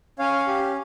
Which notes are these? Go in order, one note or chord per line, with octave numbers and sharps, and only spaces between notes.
C#4 C#5 F5
G4